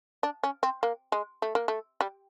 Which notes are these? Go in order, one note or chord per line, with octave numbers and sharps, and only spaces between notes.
D4
C#4
C4
A#3
G#3
A3
A#3
A3
G3